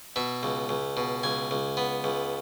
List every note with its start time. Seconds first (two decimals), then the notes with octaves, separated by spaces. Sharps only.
0.16 B2 E5
0.43 C#2
0.69 C#2
0.97 B2
1.23 C#2 G#5
1.51 C#2
1.77 B3
2.04 C#2